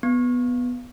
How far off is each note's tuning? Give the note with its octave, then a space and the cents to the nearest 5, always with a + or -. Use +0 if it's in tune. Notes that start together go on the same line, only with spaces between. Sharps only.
B3 -5